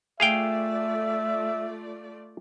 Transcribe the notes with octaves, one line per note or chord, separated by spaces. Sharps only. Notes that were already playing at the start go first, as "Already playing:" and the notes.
A3 F4 G#4 D5 E5 F5 G5